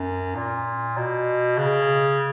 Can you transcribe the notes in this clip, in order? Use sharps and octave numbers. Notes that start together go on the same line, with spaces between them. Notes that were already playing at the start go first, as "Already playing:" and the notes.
Already playing: F#2
A#2
B2
C#3